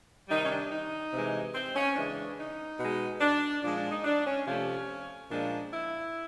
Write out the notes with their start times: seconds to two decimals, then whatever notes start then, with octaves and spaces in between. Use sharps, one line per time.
0.29 C3 D#3 G3 D#4
0.44 C#4
0.50 D4
0.70 D#4
1.13 C3 E3 G#3
1.55 C4
1.76 C#4
1.96 C#3 E3 G#3 D4
2.38 D#4
2.80 B2 G#3
3.21 D4
3.63 A#2 F3 G#3 D4
3.77 D4
3.90 D#4
4.04 D4
4.26 C#4
4.46 C3 F3 A3 C#4
5.30 A#2 F3 G#3 D4
5.72 E4